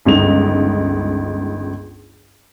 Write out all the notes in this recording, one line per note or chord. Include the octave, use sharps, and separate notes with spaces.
G1 C#2 D#4 F7